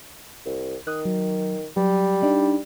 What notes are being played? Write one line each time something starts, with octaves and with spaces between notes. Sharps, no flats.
C2
D#3 D#6 F#6
F#3
F#3 G3
D4 D#4